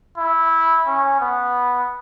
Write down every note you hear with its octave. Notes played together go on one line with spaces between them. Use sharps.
E4
C#4
B3